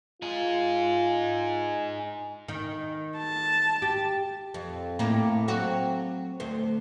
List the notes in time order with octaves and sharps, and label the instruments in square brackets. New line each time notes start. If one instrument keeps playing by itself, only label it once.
[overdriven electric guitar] D#4 G#4 [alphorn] F4
[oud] D#3
[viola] A5
[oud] G4
F2
A2 A#3
F#3 C4 F#4
D2 C5